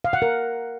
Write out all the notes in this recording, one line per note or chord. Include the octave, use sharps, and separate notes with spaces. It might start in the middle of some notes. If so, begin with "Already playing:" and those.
F5
F#5
A#4